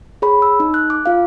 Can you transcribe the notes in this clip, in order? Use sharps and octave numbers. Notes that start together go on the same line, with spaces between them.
G#4 C#5 B5
E6
D#4
F#6
D6
F4 F5